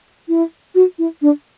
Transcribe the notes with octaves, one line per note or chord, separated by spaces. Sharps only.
E4
F#4
E4
D4